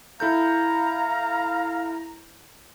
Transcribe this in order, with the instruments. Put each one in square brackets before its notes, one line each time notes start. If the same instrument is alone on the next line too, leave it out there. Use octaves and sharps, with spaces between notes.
[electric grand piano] E4 A4 G6 [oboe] F5 [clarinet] A#5